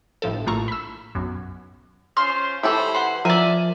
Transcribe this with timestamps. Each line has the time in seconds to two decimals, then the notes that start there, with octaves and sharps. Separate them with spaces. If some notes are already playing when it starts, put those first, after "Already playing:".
0.22 G1 A2 F3 A4
0.47 A#1 A2 A3 F4 A#5 C#6
0.68 B5 E6
1.15 B1 F#2
2.17 C#4 F4 C5 C6 F6
2.63 E3 G4 A4 C5 C#5 B5
2.95 F#5 C6
3.25 F3 A#4 D5 E5 G#5